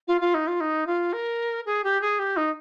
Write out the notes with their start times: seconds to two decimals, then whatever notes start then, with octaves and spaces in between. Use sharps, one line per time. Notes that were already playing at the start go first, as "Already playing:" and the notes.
0.08 F4
0.21 F4
0.34 D#4
0.47 F4
0.60 D#4
0.87 F4
1.13 A#4
1.66 G#4
1.84 G4
2.02 G#4
2.19 G4
2.37 D#4